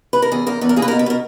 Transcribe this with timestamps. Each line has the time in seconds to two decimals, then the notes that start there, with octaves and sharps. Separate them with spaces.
0.13 B4
0.22 A#4
0.32 E2 G#4
0.47 E2 A#4
0.61 E2 B4
0.69 A#4
0.76 A#3 G#4
0.82 B4
0.88 B2 A#4
0.99 B4
1.06 B2 A#4